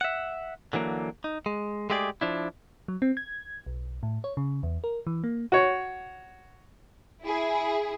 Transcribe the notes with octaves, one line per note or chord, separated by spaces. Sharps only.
E5 F#5
D3 E3 F#3 A#3
D#4
G#3
G#3 A3 G4 G#4 D5
F3 D4 E4
F#3
C4
G#6
B1
A2
C#5
C#3
E2
A#4
E3
A#3
F#4 C#5
E4 G#4